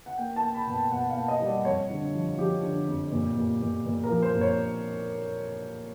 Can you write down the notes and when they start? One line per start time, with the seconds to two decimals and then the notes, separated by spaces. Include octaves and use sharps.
0.06 F#5
0.18 A#3 G5
0.36 A5
0.42 A#3
0.54 B5
0.67 B2
0.73 G5
0.91 B2 F#5
1.10 F5
1.16 A#3
1.28 D#5
1.40 G3
1.46 D5
1.65 F2 C#5
1.90 D3
2.14 F3
2.38 F3 G4
2.63 D3
2.88 F2
3.12 A#2
3.36 A#2
3.62 A#2
3.86 A#2
4.04 A#4
4.09 F3
4.22 C5
4.35 A#2
4.41 C#5